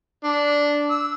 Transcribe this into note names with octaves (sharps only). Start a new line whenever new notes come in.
D4
E6